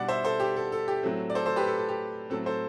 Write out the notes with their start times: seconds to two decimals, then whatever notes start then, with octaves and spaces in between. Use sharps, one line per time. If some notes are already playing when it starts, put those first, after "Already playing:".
Already playing: B2 G3 D4 D5 F#5
0.08 C5 E5
0.24 A4 C5
0.40 G4
0.56 A4
0.72 A4
0.88 G4
1.03 A2 F#3 A3 C4
1.30 D5
1.35 A4 C5
1.46 A4 C5
1.56 G4 B4
1.67 A4
1.77 A4
1.89 G4
2.30 A2 F#3 C4 A4
2.46 A4 C5